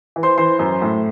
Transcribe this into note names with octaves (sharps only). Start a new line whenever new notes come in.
E3
C5 C6
E3 C5 C6
F#2
A2